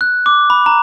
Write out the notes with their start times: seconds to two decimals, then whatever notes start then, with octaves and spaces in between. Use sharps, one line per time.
0.01 F#6
0.26 D6
0.50 B5
0.66 A#5